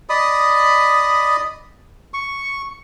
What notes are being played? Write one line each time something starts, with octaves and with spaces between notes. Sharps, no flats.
D5 D#5 B5 D#6
C#6